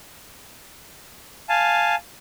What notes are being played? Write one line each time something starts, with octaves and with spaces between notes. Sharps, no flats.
F5 G#5 A5